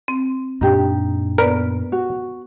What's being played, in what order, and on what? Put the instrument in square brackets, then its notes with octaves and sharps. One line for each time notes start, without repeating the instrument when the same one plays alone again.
[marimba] C4
[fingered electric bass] F#2 A#2 D4 [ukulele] D#4 G4
[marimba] B3 B4 D5 [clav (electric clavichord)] A#4
[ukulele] F#4